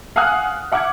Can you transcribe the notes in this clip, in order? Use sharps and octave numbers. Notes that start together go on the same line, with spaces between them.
F5 F#5 G#5 D#6 F6 F#6
E5 F#5 D6 F6 G#6